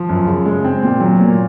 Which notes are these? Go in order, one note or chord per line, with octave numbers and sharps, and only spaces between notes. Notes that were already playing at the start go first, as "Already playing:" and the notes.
Already playing: F3
F#2
C#3
G#3
C4
A#2
F#3
A#2